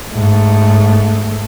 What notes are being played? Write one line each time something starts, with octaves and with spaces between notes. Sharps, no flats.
G#2 A3